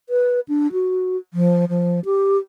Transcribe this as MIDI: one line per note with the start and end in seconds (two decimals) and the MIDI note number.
0.09 0.40 71
0.49 0.71 62
0.72 1.17 66
1.34 1.65 53
1.69 2.00 53
2.05 2.38 67